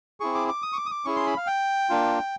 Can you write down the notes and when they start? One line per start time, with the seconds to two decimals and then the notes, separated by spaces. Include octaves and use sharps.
0.20 C4 E4 G#4 C#6
0.34 D6
0.48 D6
0.62 D#6
0.73 C#6
0.76 D6
0.86 D#6
0.91 D6
1.05 C#4 E4 G#4 C#6
1.16 C6
1.26 B5
1.37 F5
1.47 G5
1.90 A#3 D4 F4